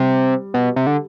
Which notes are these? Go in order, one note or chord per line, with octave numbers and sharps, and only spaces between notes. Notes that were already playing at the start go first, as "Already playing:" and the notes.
Already playing: C3 G3
B2
C3
D3